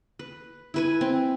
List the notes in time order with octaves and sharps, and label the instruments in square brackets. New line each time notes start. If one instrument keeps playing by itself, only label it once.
[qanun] B4
E4 B4 G#5
C4